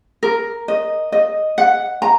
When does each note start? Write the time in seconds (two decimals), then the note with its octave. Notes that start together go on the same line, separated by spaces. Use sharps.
0.23 A#4
0.68 D#5
1.12 D#5
1.58 F#5
2.02 A#5